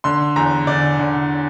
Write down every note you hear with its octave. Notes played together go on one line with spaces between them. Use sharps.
D3 C6
E2 A#5
D3 D5
D3